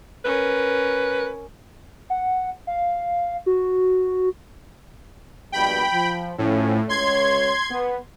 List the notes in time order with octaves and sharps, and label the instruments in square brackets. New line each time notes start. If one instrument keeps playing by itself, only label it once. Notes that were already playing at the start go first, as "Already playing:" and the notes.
[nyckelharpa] C#4 A#4 [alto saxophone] B4
[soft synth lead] F#5
F5
F#4
[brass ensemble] A#1 G2 B2 [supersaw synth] G5 B5
[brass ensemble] F3
[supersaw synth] A2 [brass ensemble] F3 C#4
[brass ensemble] C#2 C#5 [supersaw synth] C6 G#6
[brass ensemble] B3